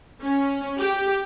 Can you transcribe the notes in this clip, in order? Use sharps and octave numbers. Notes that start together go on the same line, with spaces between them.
C#4
G4